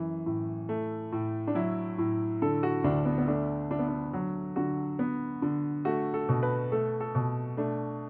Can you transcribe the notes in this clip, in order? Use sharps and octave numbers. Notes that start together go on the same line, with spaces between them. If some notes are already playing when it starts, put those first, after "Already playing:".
Already playing: F#2 E3
A2
A3
A2
D4
F#3 E4
A2
D3 A4
F#4
D2 D4
B3
B3
A3 D4
D3 D4
B3
D4
F#3
D3 F#4
B3
D3
A3 F#4
A4
B2
B4
A3 A4
A4
B2
A3 D4